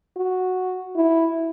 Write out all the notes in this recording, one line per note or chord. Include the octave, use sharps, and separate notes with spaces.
F#4
E4